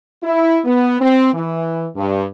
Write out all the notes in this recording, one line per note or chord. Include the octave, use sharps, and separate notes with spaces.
E4
B3
C4
E3
G2